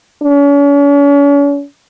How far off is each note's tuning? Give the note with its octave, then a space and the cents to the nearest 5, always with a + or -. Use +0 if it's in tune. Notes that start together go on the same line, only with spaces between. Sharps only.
C#4 +40